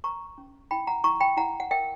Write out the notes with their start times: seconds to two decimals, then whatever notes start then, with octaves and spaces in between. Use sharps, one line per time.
0.04 B4 A#5 C#6
0.38 C#4
0.71 E4 G5 B5
0.87 F#5 A#5
1.04 E4 A#5 C#6
1.20 G5 B5
1.37 E4 F#5 A#5
1.60 F#5
1.71 A#4 E5 G5